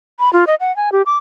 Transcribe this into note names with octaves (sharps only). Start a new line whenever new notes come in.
B5
F4
D#5
F#5
G#5
G4
D6